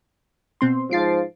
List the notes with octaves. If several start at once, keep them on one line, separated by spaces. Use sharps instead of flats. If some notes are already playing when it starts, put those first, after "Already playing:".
B2 C4 C6
G#2 F3 A6 C7 D7